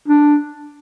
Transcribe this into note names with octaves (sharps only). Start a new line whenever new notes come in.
D4